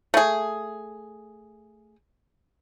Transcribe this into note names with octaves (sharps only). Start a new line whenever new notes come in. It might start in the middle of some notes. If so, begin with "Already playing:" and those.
A3 G#4